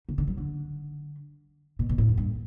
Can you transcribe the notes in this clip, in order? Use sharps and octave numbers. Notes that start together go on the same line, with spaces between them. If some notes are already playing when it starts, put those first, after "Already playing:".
C#3
D3
F#3
D3
B2
B2
A2
F#2
G2